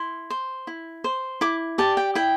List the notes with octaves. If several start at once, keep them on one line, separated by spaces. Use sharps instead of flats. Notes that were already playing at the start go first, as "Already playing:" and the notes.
Already playing: E4 C6
C5
E4
C5
E4 D6
G4 D5 A5
G5
E4 G5